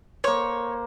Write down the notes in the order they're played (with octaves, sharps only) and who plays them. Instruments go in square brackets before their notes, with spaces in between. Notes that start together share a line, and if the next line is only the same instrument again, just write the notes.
[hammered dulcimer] A#3 C5 [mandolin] C#5